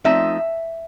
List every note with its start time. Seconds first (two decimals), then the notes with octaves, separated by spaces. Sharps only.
0.04 F3 A3 C4 D#4 E5